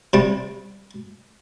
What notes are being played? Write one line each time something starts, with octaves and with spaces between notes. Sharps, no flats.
C3 G3